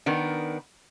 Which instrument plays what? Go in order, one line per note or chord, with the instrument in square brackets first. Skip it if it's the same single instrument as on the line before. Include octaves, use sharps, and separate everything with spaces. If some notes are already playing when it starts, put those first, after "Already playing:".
[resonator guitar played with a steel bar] D#3 B3 D4 A#4